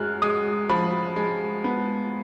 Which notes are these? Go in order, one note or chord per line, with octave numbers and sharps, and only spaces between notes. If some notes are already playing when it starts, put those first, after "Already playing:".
Already playing: F#2 G#3 F6 F#6
G#3 D#6
F3 B5
G#3
B3